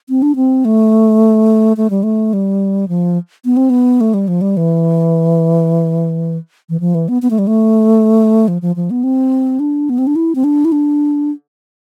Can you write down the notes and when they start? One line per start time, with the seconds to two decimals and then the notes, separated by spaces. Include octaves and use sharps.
0.09 C4
0.22 D4
0.36 C4
0.65 A3
1.77 A3
1.90 G3
2.03 A3
2.33 G3
2.89 F3
3.45 B3
3.57 C4
3.70 B3
4.01 A3
4.14 G3
4.28 F3
4.41 G3
4.57 E3
6.69 E3
6.80 F3
6.95 E3
7.09 B3
7.22 B3
7.30 A3
7.39 G3
7.47 A3
8.48 F3
8.62 F3
8.76 F3
8.91 B3
9.04 C4
9.60 D4
9.90 B3
9.98 C4
10.07 D4
10.16 E4
10.35 C4
10.44 D4
10.65 E4
10.72 D4